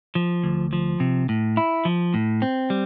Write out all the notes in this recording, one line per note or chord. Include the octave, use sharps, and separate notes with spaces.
F3
D2
F3
C3
A2
E4
F3
A2
C4
G3